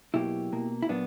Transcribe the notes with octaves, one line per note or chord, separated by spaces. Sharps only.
B2 F#3 A#3 E4 G4
B2 A#3
E4
A#2 F#3 A#3 B3 D4